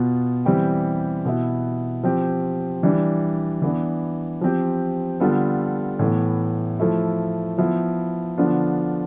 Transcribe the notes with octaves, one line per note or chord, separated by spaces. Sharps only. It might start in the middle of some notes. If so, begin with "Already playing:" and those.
Already playing: B2 B3 F4
E3 G3 C4 G4
B2 B3 E4
F3 C4 G4
E3 G3 D4
E3 B3 D4
F3 C4 G4
D3 G3 B3 F4 A4
A2 E3 B3
F3 A3 E4
F3 B3 E4
D3 F3 B3 D4 F4